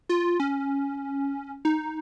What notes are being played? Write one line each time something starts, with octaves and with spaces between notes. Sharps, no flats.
F4
C#4
D#4